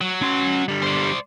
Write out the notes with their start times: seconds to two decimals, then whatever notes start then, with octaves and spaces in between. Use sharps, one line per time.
0.01 F#3
0.22 C#4 C6
0.68 D3 G3
0.83 C5 D5